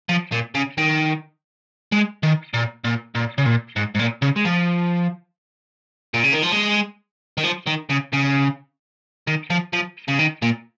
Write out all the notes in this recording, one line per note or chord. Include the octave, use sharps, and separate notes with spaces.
F3
A#2
C#3
D#3
G#3
D#3
A#2
A#2
A#2
C#3
A#2
G#2
G#2
A#2
C#3
G#3
F3
A#2
C#3
D#3
F3
G#3
D#3
F3
D#3
C#3
C#3
D#3
F3
F3
C#3
D#3
A#2